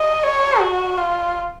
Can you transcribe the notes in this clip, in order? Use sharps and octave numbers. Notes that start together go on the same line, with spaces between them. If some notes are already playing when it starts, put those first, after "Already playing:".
Already playing: D#5
C#5
F#4
F4